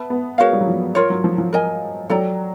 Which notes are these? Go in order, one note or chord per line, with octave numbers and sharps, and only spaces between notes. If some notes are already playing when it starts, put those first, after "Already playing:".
Already playing: B3 B4 E5 A5
B3
G#3 F#4 A#4 C#5 F5
G3
F#3
F3
F4 A#4 C#5
F#3
F3
F3
A#4 D#5 G#5
F#3 A4 D5 G5 A#5